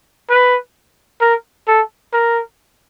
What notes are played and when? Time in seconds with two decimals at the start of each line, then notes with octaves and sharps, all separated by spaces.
0.30 B4
1.21 A#4
1.68 A4
2.13 A#4